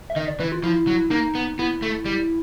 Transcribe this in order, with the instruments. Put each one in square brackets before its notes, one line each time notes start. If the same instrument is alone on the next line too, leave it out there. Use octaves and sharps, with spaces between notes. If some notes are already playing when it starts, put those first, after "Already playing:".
[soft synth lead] E5
[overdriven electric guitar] D#3 [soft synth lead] D#5
[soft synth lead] D5
[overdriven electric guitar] E3 [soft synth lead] B4
[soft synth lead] F4
[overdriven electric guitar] F3 [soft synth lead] E4
[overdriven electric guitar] F#3
[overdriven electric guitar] A#3 [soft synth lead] D#4
[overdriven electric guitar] B3
[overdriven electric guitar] B3 [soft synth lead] E4
[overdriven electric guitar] A3
G3